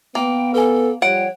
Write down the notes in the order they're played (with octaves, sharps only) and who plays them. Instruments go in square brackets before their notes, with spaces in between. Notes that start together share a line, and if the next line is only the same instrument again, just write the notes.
[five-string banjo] A#3 [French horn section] B3 [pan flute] G5
[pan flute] A4 [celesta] B4 G#5
[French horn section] F3 G3 [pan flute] C#5 [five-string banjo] F#5 [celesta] D7